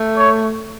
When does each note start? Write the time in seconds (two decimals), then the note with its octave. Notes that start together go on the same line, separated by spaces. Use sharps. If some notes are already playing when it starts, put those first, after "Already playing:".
Already playing: A3
0.17 C#5